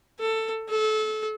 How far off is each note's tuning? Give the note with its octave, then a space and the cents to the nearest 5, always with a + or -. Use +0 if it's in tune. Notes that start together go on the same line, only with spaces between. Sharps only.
A4 +15
A4 -30